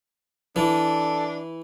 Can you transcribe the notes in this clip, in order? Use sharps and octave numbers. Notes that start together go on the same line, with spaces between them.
E3 D4 A4